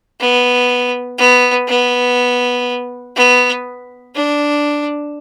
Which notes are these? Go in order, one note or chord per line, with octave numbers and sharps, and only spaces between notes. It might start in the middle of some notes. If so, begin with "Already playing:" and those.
B3
B3
B3
B3
D4